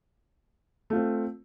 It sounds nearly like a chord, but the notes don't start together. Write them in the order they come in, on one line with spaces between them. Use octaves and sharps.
A3 F4 C4